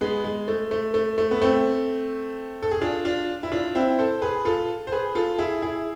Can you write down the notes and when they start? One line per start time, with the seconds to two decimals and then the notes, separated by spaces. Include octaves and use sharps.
0.01 G#3 B3
0.24 G#3
0.48 A3
0.71 A3
0.94 A3
1.18 A3
1.31 B3
1.41 A3 C4
2.63 A4
2.71 G#4
2.81 D4 F4
3.05 D4 F4
3.43 E4
3.52 D4 F4
3.75 C4 E4
3.99 A4 C5
4.22 G#4 B4
4.45 F4 A4
4.87 C5
4.92 G#4 B4
5.15 F4 A4
5.39 E4 G#4
5.62 E4 G#4